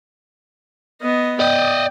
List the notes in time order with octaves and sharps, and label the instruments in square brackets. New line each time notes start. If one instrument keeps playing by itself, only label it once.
[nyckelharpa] B3 D#5
[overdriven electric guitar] D5 D#5 [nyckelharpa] G5